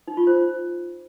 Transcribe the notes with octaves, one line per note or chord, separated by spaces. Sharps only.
D#4
F4
C5